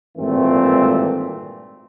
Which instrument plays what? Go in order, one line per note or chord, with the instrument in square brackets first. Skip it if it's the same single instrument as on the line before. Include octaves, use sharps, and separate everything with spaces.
[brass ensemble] G#1 G2 A#2 E3 A3 C4